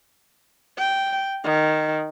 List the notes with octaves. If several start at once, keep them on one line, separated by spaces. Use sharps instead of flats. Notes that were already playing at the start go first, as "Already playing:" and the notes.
G5
D#3